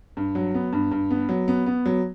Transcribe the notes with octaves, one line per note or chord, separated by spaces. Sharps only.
G2
F#3
B3
G2
G2
B3
F#3
B3
B3
F#3